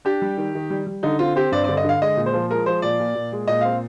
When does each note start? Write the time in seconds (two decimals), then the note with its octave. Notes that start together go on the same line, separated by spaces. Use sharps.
0.05 D4 G4
0.22 G3
0.38 D#3
0.55 D#3
0.70 G3
0.87 G3
1.03 D3 D#4
1.19 C4 F4
1.36 C4 G4
1.52 G2 D5
1.64 D5
1.69 D3
1.77 D#5
1.85 D3 F5
2.02 G#3 D#5
2.17 A#2
2.26 C5
2.33 F3
2.50 G#3 A#4
2.66 F3 C5
2.82 A#2 D5
3.00 A#2
3.15 A#2
3.32 G#3
3.48 A#2 D#5
3.61 C4 F5